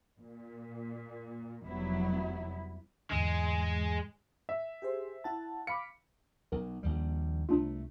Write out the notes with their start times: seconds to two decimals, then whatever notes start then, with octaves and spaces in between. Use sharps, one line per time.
0.20 A#2
1.65 F1 F#3 G3 B3 E4
3.11 E2 G#2 D3 G#3
4.49 E5
4.82 G4 G#4 C5
5.24 E4 F#5 A5
5.67 F5 B5 D6 C#7
6.52 B1 A#4
6.83 A#1 D#2 G3
7.49 C2 A3 D4 F4